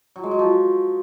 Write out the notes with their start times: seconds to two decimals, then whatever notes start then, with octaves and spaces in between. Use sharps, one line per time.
0.16 F#3
0.23 G#3
0.31 F#3
0.39 F3